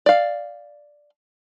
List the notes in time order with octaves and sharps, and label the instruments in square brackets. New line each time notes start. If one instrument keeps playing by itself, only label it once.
[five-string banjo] D5 F5